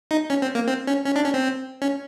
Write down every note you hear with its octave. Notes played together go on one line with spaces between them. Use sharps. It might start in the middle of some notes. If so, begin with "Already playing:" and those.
D#4
C#4
C4
A#3
C4
C#4
C#4
D4
C#4
C4
C#4